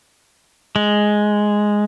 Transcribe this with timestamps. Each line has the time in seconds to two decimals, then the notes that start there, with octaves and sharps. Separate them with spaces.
0.76 G#3